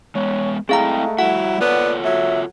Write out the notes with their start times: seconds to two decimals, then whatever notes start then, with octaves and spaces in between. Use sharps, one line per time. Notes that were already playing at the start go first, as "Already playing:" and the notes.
0.15 G#3 B3 C#5
0.69 G#3 A3 C4 E4 G#4 F5 G5 A#5
1.19 G3 E4 F#4 F#5
1.61 B3 F4 A4 C#5 D5
2.05 F#3 E5